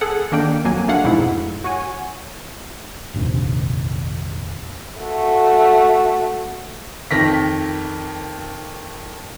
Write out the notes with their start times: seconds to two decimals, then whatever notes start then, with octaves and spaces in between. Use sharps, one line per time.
0.01 G#4 A4 F#5
0.32 D#3 A#3 D4 G5
0.64 F2 F#3 A#3 F#4 G#5
0.88 G3 A3 D4 F5 F#5
1.04 F2 G#2 B2 G#3 D#4 E4
1.64 F#4 C#5 F#5 G#5
3.14 F1 A#1 D#2 C3
5.01 A3 F#4
7.11 F2 D#3 A#6 B6